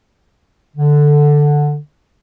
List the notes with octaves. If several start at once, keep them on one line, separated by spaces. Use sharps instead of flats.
D3